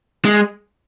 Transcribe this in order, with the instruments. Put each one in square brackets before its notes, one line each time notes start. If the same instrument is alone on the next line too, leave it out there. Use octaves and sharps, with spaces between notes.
[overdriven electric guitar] G#3